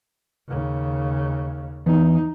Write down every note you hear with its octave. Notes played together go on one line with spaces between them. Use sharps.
D#2 C#3
E2 D#4